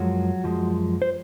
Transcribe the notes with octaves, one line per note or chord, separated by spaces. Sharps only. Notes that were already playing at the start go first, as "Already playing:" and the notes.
Already playing: F#2 F3 F#3 G#3 F#4
F#2 F3 G#3
C5